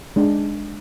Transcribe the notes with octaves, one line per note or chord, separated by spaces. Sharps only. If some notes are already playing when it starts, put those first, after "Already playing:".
G#3 D4